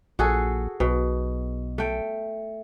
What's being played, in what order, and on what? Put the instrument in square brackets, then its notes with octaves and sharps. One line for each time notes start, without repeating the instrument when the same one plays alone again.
[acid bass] A#1 [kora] F#4 G#4 A4
[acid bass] B1 [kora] B2
[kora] A3 G5